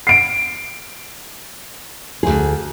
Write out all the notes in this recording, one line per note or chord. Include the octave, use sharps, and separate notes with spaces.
C7 D7
D2 G#2 G#4